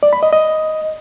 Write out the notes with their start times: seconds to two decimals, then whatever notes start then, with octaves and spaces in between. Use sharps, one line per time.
0.03 D5
0.13 B5
0.23 D#5
0.33 D#5